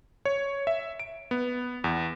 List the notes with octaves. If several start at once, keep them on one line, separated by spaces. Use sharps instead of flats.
C#5
E5
D7
B3
E2